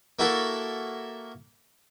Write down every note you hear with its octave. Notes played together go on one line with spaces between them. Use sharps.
A#3 E4 F#4 A4 A#4